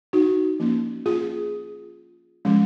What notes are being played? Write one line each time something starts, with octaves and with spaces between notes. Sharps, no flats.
D#4 F#4
F3 A#3 C#4
F4 G#4
F3 G#3 C#4